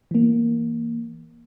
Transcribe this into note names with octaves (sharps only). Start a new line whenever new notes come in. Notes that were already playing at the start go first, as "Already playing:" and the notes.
E3 A#3